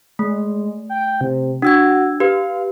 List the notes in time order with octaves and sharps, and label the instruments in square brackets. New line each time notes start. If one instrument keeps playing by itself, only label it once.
[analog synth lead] G#3 [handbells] A3
[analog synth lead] G5
C3
[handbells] D4 E6 G#6 [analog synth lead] F#4
[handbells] G4 B4 [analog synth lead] F5